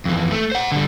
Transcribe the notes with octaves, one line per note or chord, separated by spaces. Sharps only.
F2 E3
A3
C5 F#5
D3 G3